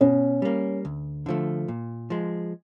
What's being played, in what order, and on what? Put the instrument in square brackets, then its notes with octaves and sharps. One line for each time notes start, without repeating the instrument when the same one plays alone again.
[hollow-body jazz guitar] B2 [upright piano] C#4
[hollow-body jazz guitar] G3 A#3
D2
D3 F3 A3
A#2
F3 G#3